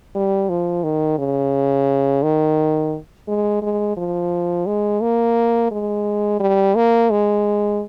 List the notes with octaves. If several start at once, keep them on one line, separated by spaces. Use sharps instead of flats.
G3
F3
D#3
C#3
D#3
G#3
G#3
F3
G#3
A#3
G#3
G3
A#3
G#3